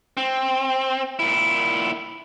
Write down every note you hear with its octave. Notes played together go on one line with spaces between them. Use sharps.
C4
A#2 E4